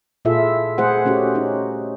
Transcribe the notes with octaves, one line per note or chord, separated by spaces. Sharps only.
A#2 E4 F4 G#4 A4 E5
A3 G#4 C5 F#5
A3 C#4 F#4 G4
C#4 D#4